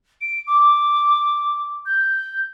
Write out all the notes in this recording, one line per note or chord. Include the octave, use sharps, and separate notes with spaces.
D7
D6
G6